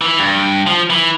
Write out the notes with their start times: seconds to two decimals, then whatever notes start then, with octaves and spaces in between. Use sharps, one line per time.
0.01 E3
0.19 G2
0.67 F3
0.90 E3